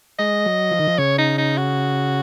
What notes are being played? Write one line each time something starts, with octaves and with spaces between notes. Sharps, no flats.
G#3 D#5
F#3
F3
D#3
F3
C#3 C#5
D#4
D#4
F#4